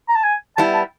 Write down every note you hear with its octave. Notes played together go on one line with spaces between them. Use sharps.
A#5
A5
G#5
G3 B3 E4 A5
A5